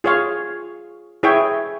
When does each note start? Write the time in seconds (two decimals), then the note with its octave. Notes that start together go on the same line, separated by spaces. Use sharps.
0.04 F4 G#4 C#5 F5
1.23 E4 G#4 C#5 E5 G5